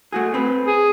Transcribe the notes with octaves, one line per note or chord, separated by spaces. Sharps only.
A3 F#4 G#4
C4 B4
G#4